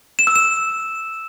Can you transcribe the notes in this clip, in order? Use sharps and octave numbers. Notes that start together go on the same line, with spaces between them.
E7
E6
E7